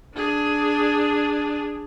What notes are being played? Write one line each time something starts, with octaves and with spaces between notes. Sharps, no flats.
D4 G#4